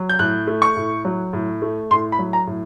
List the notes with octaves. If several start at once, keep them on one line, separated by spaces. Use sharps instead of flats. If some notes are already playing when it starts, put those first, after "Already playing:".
Already playing: F#3
G6
A2 F#6
A3
C#6
A2
F#3
A2
A3
A2 C6
B5
F#3
A#5
A2